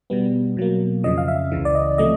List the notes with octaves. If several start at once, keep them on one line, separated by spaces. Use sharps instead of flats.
B2 G3 B3
B2 F#3 A#3
F2 C#3 F3 D#5
F5
E5
C#2 C#3 E3
D5
D#5
C3 F3 A3 D#5